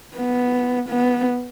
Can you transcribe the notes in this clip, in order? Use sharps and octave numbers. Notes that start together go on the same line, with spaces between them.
B3
B3